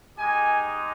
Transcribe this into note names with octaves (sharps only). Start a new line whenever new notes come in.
G#3 D#4 G4 G#5